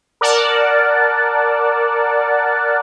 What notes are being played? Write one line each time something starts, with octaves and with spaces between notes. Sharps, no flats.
A#4 D5 F#5 A5